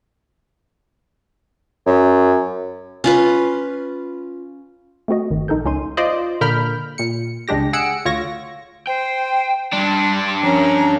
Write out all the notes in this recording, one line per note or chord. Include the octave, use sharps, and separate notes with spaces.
F#2
C#4 F4 B4
A3 C4 F#4 D#5
G1 D#3
A#1 D#4 A4 A#4 G6
C#2 C#4 D#4 C6 D#7
F4 C5 D5 D#5
A#2 D3 A#4 B5 F6 G6
A#2 C#7
C#2 G#3 D4 G4 A#6
G#4 F#5 E6 C#7 D7
D2 F4 C#5 C#6 A#6
C5 G5
G2 G3 D4 C6
F3 C#4 A#4 A#5